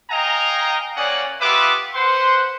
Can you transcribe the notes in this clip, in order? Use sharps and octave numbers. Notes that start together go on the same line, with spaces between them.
D#5 F5 G5 G#5 A#5
A#3 C#4 D5 D#5 F#5 G#5
B3 F4 G4 B4 E5 D6
B4 C5 F#5 C6